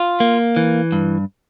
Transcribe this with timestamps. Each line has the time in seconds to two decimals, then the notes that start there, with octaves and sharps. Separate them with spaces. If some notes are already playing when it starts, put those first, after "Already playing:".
Already playing: F4
0.20 A#3
0.56 E3
0.92 G2